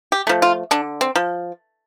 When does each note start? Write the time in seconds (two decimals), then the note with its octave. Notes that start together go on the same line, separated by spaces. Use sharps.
0.12 G4
0.27 F3 A3
0.42 F4
0.71 D3 D4
1.01 C4
1.16 F3